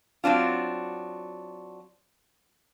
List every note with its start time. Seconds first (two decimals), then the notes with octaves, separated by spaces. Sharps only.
0.24 F#3 C4 D4 F4